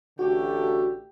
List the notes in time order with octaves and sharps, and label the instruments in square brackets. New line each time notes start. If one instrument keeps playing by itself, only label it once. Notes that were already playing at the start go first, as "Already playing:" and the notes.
[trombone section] A1 D3 A3 [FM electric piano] F#4 [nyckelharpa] G4